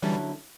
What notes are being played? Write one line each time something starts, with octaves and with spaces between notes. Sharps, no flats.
D3 E3 F#3 G3 C#4 E4 A4